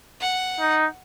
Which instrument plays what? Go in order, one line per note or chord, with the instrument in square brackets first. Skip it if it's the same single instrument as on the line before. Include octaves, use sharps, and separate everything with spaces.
[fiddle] F#5
[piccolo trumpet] D#4